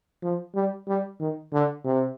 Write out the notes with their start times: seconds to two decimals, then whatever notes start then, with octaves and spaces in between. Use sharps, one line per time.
0.23 F3
0.55 G3
0.88 G3
1.20 D#3
1.53 D3
1.85 C3